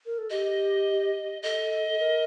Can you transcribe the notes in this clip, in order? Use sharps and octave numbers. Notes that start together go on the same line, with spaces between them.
A#4
A4
G4 D#5
A4 D#5
A4
A#4